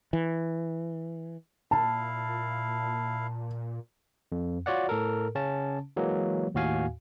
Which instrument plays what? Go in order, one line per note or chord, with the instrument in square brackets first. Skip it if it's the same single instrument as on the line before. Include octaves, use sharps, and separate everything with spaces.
[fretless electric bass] E3
[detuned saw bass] A#2 [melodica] E4 F5 [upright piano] A5
[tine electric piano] F2
F4 F#4 C#5 D5 F#5
A2 A4 A#4
C#3 C#4 A5
E3 F#3 G#3 A#3
D#2 A2 F#4 F5 G#5